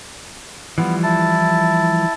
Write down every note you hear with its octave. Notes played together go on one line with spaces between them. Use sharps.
E3 F3 G3 B3
E4 A5